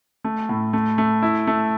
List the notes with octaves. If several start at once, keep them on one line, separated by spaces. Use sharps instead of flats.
A3
A2
A3
A3
E4
A3